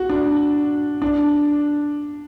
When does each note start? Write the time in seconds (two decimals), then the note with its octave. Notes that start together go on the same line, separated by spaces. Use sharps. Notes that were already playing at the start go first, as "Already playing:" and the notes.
Already playing: F#4
0.09 D4
1.02 D4